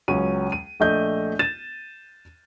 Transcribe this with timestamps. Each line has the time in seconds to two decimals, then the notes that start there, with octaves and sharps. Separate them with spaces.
0.08 C#2 F#3 C#4 D#7
0.52 D#7
0.80 A#1 A3 D#5 G6
1.39 A6 D#7 E7